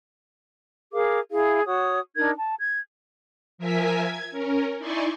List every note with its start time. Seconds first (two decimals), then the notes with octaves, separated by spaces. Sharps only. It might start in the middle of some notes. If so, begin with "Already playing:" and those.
0.92 G#4 A#4 F5 D6
1.30 E4 G#4 F5
1.65 F#4 C#5 D#6
2.16 D4 D#4 A#4 G#6
2.37 A5
2.58 G#6
3.58 F3 A#4 E5 G#5 B6
4.01 G#6
4.31 C#4 A#4
4.78 D#4 E4 D5 G#5 C6 C#6